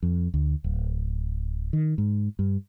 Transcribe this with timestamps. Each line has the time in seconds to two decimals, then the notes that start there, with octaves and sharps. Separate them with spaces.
0.03 F2
0.34 D2
0.64 D1
1.73 D#3
1.98 G#2
2.39 G2